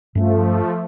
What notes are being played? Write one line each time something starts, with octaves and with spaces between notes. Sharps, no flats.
G2 F3 A3 C#4